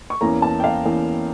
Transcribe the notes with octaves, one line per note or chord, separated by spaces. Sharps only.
C#6
E2 E3 A#3 C#4 A#5
A5
G5
F5
E2 E3 A#3 C#4